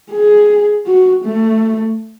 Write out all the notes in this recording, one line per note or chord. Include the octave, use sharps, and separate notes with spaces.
G#4
F#4
A3